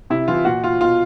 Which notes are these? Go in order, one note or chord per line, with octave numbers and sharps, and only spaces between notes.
C3 E4
E3 F4
A#2 F#4
F4
B2 F4